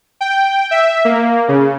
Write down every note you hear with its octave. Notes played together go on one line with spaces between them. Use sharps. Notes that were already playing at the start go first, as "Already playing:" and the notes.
G5
E5
A#3
C#3